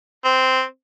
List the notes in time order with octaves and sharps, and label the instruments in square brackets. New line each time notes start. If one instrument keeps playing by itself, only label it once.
[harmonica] C4